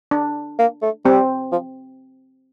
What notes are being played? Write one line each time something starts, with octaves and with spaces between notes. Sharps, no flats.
D4
A#3
A3
G3 C4
F3